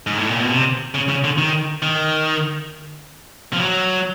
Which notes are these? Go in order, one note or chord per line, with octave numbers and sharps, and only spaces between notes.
G#2
A2
A#2
B2
C3
C#3
C#3
D3
D#3
D#3
F3
F#3